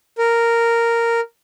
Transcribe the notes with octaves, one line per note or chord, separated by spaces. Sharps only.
A#4